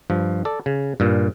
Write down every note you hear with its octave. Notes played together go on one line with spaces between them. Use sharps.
G2 F3
A4 D5
C#3
G2 A#2